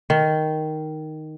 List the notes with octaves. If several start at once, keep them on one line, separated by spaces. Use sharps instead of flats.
D#3